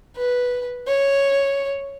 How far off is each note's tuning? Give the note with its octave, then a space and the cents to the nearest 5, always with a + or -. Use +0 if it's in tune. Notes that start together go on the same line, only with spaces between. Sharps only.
B4 -5
C#5 +0